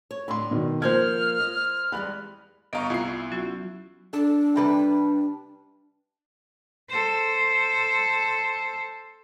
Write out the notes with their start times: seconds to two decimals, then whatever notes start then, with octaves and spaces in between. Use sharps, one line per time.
0.11 C#5
0.28 A2 D3 G3 B5 C6
0.51 B2 D#3
0.82 F3 A#3 C5 F6 G6 G#6
1.40 D#5
1.92 E2 G3 G#3 B5 F#6
2.73 G1 B3 D#5 F5 A#5 C#6
2.90 C2 E4 F4 C7
3.32 F#3 C#4 F#4
4.13 D4 A4
4.56 C3 G3 B4
6.89 A4 C5